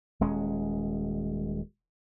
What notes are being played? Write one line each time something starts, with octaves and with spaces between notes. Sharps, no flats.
D#1 G#3 C#4